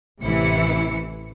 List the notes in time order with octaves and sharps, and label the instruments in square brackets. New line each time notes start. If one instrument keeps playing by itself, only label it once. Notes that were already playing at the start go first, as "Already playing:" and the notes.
[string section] A1 C3 E3 E4 C#7